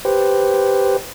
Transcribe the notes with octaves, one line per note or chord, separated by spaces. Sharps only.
G4 B4 C5